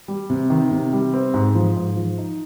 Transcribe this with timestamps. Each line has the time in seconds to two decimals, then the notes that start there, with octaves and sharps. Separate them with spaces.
0.08 G3
0.30 C3
0.50 D#3
0.71 C3
0.93 G3
1.14 C4
1.34 G#2
1.55 F3
1.77 G#2
1.97 F3
2.18 D#4